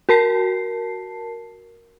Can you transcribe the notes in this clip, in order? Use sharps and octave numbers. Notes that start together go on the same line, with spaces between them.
F#4 A#4 A5 C7